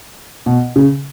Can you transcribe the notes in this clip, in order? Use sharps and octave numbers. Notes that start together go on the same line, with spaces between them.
B2
C#3